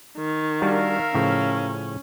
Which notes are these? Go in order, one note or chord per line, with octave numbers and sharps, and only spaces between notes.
D#3
G3 D4 F#4 A#4 E5 F5
A2 C#3 F3 C#4